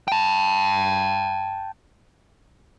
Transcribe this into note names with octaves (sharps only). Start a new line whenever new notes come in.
G5 A5